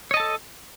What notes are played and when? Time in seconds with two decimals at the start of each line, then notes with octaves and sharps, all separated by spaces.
0.11 C#5
0.14 D#5
0.17 A5
0.20 A4